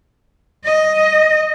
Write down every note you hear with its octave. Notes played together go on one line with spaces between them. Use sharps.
D#5